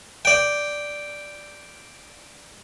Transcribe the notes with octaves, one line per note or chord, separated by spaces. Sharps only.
D5 G5